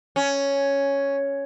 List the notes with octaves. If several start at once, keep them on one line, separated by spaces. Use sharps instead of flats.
C#4